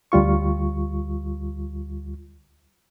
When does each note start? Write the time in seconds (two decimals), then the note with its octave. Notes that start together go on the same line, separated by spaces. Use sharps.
0.12 D2 G3 F4 C#6